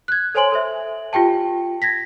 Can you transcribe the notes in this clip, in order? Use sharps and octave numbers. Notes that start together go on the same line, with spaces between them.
F#6 G#6
A4 C5 C#5 G#5 C6 F#7
A4 C5 E5
F4 G4 G5 A5
G#6 A#6 B6